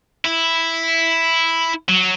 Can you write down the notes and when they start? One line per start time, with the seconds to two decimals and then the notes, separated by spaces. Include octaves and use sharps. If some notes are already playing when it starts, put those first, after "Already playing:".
0.25 E4
1.88 F#3